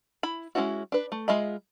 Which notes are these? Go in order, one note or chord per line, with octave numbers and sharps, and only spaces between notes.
E4 B5
G#3 A3 C#4 E4 F#4
D4 B4
A3
G#3 F4 D#5 E5 B5